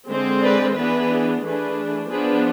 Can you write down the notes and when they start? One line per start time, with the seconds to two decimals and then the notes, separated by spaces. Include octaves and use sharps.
0.08 D3 G#3 C4
0.41 B4 D5
0.75 E3 B3 D4 G#4 B4
1.42 E3 A3 D4 G#4 B4
2.09 F3 B3 D4 G#4 B4